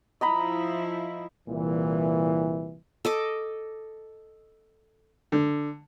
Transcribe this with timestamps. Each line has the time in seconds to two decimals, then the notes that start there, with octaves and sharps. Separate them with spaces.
0.21 F3 E4 D#5 A#5 B5
1.49 C2 A#2 E3
3.05 A4 D#5 D6
5.32 D3